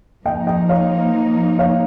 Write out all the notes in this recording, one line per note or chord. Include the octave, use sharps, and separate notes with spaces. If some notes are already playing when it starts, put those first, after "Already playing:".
F3 A#3 D#4 D#5 G5
D#5 G5
C#5 F5
C#5 F5